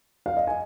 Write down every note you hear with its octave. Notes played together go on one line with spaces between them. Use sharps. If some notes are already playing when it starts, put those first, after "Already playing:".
F5
D#5
G#5